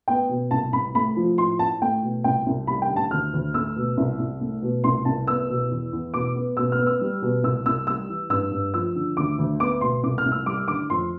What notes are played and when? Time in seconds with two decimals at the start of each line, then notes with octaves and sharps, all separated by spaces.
0.08 B3 G5
0.29 B2
0.51 C2 A5
0.73 C2 B5
0.95 A3 B5
1.16 F3
1.38 A2 C6
1.59 A2 A5
1.81 A3 G5
2.02 B2
2.24 C2 G5
2.46 C2
2.67 G3 B5
2.82 G5
2.90 D3
2.96 A5
3.11 D2 F6
3.33 D2
3.54 A3 E6
3.76 B2
3.97 C2
4.19 C2
4.41 A3
4.62 B2
4.84 C2 C6
5.05 C2 A5
5.27 B3 E6
5.49 B2
5.71 E2
5.92 E2
6.14 B2 D6
6.35 B3
6.57 B2 E6
6.72 F6
6.79 B3
6.87 E6
7.01 G3
7.22 B2
7.43 C2 E6
7.66 C2 E6
7.87 G3 E6
8.09 E3
8.30 G2 E6
8.51 G2
8.74 F3 E6
8.95 D3
9.17 D2 D6
9.38 D2
9.60 B3 D6
9.81 B2 C6
10.03 C2 D6
10.18 F6
10.26 C2
10.32 E6
10.46 G3 D6
10.68 D3 D6
10.90 F2 C6